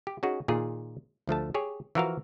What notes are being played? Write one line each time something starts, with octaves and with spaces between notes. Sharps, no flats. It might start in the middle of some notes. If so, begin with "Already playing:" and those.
G4
C#4 D#4 F#4 G#4
A#2 D#3 F4 G#4
D2 F3 A3 A5
G4 G#4 C#5
E3 F3 F#4 A#4 E5 F5